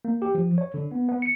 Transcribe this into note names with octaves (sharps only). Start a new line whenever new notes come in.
A#3
G4
F3
C#5
D3
B3
B3
C#7